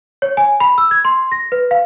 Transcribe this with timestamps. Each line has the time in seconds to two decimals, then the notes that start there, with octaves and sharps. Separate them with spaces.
0.22 C#5
0.37 G#5
0.60 B5
0.78 E6
0.91 G#6
1.05 C6
1.32 A#6
1.52 B4
1.71 F5